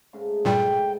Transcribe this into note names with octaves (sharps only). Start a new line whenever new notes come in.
G#2 C#3 A3
G2 A#2 G3 G5